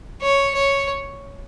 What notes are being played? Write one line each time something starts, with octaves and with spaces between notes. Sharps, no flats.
C#5
C#5